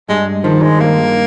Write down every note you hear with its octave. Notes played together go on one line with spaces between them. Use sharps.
G2 G#3
D#3 F3
G#3
G2 A#3